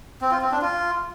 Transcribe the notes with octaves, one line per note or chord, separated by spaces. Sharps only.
C4
F4
C4
D4
F4